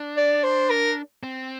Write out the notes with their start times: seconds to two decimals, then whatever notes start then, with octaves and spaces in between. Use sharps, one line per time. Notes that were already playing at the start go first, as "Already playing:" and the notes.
Already playing: D4
0.17 D5
0.43 C5
0.70 A#4
1.23 C4